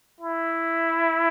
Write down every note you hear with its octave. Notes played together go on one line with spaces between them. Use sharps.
E4